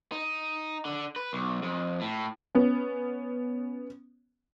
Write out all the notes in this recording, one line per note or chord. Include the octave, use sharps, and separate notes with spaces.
D#4
D3
B4
B1
F2
A2
B3 C#4